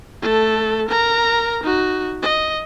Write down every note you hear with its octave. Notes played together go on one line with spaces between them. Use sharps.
A3 A4
A#4 A#5
D#4 F#4
D#5